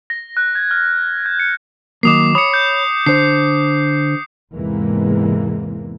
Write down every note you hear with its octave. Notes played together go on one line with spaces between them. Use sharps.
A#6
F#6
G#6
F6
G6
C#7
D#3 F#3 A#3 D6 D#6 C7
C#5 B5 D#6 C#7
G6
D3 C5 C7
E2 G#2 C3 E3 G#3 A#3